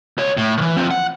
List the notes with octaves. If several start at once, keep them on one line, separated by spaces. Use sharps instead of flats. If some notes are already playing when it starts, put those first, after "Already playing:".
C#2 C#5
A2
D#3 E3
F3 C4
F#5